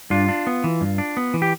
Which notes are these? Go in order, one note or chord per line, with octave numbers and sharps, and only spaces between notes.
G2 D4 F4
D4
B3
E3
G2
D4
B3
E3
G4